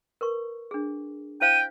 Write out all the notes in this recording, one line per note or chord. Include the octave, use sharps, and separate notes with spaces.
A#4 B4 C#6
D4 G#4
E4 C5 F5 G5 D#7